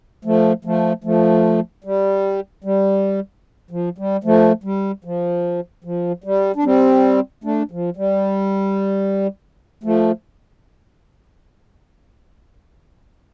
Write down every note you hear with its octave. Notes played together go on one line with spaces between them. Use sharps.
F3 A3
F3 A3
F3 A3
G3
G3
F3
G3
F3 A3
G3
F3
F3
G3
D4
G3 C4
A3 D4
F3
G3
F3 A3